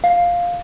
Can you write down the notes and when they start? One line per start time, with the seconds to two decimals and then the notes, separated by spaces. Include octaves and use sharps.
0.04 F5